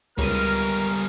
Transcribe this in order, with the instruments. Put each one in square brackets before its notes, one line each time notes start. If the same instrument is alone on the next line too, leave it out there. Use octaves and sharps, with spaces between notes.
[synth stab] C#2 D#7 [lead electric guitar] G3 B3 [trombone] A#4 [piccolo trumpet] F6